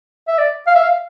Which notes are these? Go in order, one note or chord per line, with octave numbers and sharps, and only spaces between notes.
E5
D5
F5
E5
F5